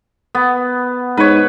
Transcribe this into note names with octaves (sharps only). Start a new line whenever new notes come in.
B3
G#2 B4 C#5